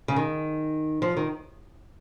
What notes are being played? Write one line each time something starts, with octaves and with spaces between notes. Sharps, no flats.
C#3
D#3
F3
D#3